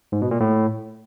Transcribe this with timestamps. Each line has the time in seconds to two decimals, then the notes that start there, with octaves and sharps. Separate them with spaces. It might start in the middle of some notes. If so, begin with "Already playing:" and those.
0.12 G#2
0.22 B2
0.31 A#2
0.40 A2